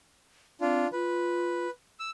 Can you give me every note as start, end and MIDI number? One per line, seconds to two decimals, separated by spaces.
0.61 0.86 60
0.61 0.88 62
0.61 0.88 65
0.92 1.67 65
0.92 1.70 71
2.00 2.10 88